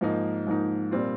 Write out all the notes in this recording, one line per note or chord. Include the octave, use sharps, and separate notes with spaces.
G#2 F3 A#3 D#4
G#2 F3 A#3 D#4
A#2 G3 C4 F4